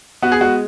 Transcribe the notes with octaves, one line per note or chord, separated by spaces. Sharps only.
B3 F#4
G#4
G#3 F#4